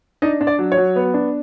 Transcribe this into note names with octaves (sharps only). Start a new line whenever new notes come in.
D4 D#4 D#5
D4
D5
F#3
C#5
F#3
B3
D4